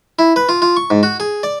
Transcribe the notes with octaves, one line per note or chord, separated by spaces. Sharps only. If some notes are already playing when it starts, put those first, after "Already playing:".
E4
B4
F4
F4
C#6
G#2
F#4
G#4
D5